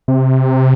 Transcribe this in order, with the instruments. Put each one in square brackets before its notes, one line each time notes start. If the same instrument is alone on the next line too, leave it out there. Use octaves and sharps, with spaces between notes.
[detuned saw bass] C3